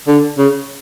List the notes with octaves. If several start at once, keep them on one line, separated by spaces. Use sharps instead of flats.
D3
C#3